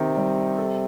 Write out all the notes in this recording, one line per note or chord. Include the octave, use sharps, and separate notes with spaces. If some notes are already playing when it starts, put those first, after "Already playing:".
Already playing: C3 D#3 C4 G4
G3
A4